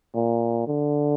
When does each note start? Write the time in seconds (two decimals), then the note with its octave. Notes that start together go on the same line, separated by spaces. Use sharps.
0.14 A#2
0.67 D3